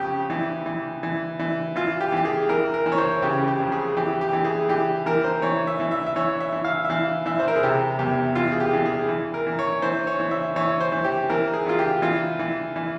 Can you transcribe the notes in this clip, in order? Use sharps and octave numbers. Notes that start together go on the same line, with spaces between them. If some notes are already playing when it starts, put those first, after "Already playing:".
Already playing: F2 C#3 G4
E3
E3
E3
E3
E3 F4
G4
E3 G4
G#4
E3 A#4
A#4
E3
C#5
C5
C#3 G4
G4
F2
G#4
E3 G4
G4
E3
G#4
E3 G4
E3 A#4
C5
E3 C#5
E5
E3
E5
E5
E3 C#5
E5
E3
F5
E5
E3 F5
E3 E5
C5
A#4
G#4
C3 G4
E2 G4
E3 F4
G#4
G4
E3
G#4
E3
A#4
E3
C#5
E3 C5
C#5
E3
E5
E3 C#5
C5
E3
G4
E3 A#4
G#4
E3 F4
G4
E3 F4
E3
E3